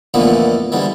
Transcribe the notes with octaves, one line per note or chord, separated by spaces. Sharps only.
F2 A#2 D3 E3 A3 B3
G#2 D3 E3 G3